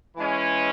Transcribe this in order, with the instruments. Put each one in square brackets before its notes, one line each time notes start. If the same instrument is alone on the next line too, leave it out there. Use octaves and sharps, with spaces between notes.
[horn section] E3 G#3 C#4